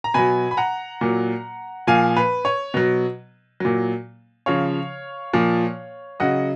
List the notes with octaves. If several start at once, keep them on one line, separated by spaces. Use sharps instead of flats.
A#5
B2 F#3 G#5 B5
B5
F#5 A#5
A#2 F#3
A#2 F3 F5 G#5
B4
C#5
B2 F#3
A#2 F#3
C#3 F3 C#5 F5
A#2 F3
C#3 F#3 D#5 F#5